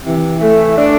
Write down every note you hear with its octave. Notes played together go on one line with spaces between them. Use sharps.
C3 E3
E3 A3
A3 D4